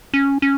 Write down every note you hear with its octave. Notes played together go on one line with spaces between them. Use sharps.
C#4
C#4